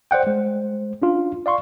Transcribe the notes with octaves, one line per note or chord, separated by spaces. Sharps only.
C5 D5 F#5 G5
G#3 C5
C#4 D4 F4
D5 F5 C6 C#6